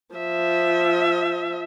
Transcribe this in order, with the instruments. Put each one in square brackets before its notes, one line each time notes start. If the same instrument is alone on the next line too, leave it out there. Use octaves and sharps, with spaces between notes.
[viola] F3 E5